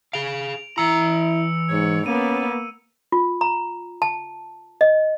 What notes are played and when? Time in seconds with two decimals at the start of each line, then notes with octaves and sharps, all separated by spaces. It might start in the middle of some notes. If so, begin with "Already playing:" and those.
0.13 G#4 F5 D7 F7
0.78 E3 E4 A#5 E6 C#7
1.71 G#2 C#5
2.06 A#3 B3 C#4 D#7
3.12 F4
3.41 A#5
4.02 A5
4.81 D#5